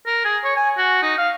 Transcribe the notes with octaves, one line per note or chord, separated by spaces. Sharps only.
A#4
G#4
C#5
G#5
F#4
D#4
F5